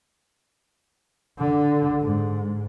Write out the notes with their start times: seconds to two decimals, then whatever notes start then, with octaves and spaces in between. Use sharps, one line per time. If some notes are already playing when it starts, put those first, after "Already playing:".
1.39 D3
2.01 G#2